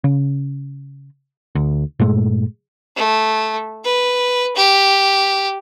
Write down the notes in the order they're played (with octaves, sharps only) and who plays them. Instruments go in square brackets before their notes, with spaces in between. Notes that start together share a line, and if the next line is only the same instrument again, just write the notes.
[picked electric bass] C#3
D2
G2 A#2 G#3 A3
[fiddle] A3
B4
G4